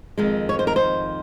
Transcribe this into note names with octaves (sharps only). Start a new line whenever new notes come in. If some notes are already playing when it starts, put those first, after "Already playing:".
F2 D#3 G#3
C#5
C5
A#4
C5